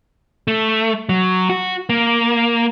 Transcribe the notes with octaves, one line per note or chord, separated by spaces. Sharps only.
A3
F#3
F#4
A#3